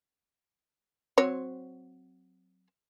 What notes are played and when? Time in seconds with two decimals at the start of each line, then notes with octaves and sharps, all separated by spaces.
1.18 F#3 C4 C#5